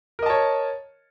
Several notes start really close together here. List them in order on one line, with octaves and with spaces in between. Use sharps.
A#4 D#5 A5 C#5